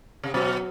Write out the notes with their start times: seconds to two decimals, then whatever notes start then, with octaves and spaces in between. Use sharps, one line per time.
0.23 C3
0.34 B2 F#3